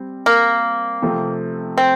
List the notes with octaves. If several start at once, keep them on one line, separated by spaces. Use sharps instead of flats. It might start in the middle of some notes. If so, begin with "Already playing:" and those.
Already playing: G3 C4
A#3
C3 F3 A3 C4
C4